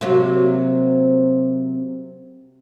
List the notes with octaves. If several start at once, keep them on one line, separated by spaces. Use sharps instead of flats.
C3 F#3 A#3